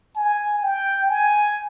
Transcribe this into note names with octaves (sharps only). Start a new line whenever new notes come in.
G#5
G5
G#5